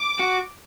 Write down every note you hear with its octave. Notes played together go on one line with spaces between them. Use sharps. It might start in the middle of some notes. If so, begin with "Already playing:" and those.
Already playing: D6
F#4